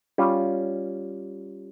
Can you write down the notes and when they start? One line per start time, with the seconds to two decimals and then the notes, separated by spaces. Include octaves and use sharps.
0.18 G3 C#4 F4